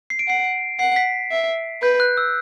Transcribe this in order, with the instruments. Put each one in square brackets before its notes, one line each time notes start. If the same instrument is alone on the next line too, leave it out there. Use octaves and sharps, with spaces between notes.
[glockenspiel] C7
D7
[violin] F#5 [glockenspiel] C7
[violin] F#5 [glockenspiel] C7
[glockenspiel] B6
[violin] E5
[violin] B4 [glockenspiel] G6
[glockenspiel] F#6
E6